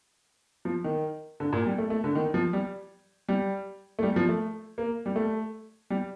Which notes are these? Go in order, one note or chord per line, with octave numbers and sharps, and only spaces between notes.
F3
D#3
D3
A#2
G3
A3
A3
D3
D#3
F3
G3
G3
A3
G3
F3
A3
A#3
G3
A3
G3